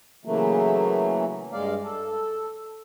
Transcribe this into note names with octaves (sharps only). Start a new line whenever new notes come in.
C#3 E3 F#3 A3 A#3
G2 G#3 D5 F5
A4